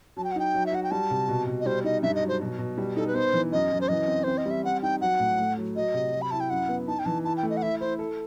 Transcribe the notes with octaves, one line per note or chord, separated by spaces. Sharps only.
F#3 A5
G5
F#5
D#4 G5
F#3
E5
F#4 F#5
G5
G3 A5
C3
B2
B2
D#5
G3 C5
D#4 D#5
G2 E5
D#5
F#3
C5
B2
B2
G3
D#4 A4
B4
B3 C5
E3
F#2 D#5
F#2
C5
E3 D#5
C4
C4 C5
D#5
G3 E5
C4 F#5
D#4 G5
F#3 F#5
A2
A3
F#3
F#3 D#5
C3
F#3
B5
E4 A5
G5
F#2 F#5
B3
D#4 A5
G5
E3 A5
E4 A5
G5
A3
D#5
F#5
E4 E5
E4 C5
A4